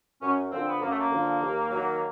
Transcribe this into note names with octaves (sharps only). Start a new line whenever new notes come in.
F#2 C#4
D3 F3 C4
B3
F#2 A#3
A3
A#3
D3 F3
D#2
D#3 F#3